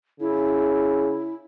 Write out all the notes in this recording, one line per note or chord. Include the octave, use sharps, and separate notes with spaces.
C#3 E4